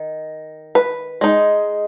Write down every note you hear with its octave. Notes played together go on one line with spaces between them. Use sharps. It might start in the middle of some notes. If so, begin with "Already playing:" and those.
Already playing: D#3
B4
G#3 D#4